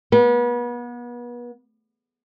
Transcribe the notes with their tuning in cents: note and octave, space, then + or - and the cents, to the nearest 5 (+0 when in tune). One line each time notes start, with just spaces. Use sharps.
B3 -35